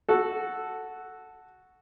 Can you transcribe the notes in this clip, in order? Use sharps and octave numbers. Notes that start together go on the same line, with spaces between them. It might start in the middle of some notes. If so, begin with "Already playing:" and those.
F#4 A4